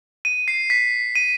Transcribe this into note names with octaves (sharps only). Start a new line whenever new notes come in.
D#7
C7
B6
D#7